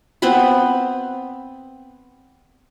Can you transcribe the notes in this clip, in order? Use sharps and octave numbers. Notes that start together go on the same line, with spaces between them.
B3 C4 B4 B5